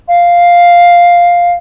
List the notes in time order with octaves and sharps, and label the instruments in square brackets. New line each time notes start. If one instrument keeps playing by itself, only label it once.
[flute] F5